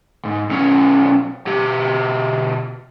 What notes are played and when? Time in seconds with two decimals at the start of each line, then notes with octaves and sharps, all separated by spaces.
0.25 G#2
0.49 B1 C#4
1.47 B2 G4